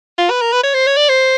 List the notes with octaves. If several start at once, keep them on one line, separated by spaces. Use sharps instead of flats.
F4
B4
A#4
B4
C#5
C5
C#5
D5
C5